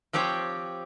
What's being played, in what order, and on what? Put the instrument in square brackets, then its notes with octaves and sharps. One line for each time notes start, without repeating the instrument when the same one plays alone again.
[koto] F3 C4 G4 C#5 G5